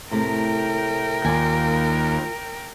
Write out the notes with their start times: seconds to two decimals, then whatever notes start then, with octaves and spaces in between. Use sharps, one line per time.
0.11 A2 C3 A3 A#4 G5
1.25 D#2 F4 D5 G#5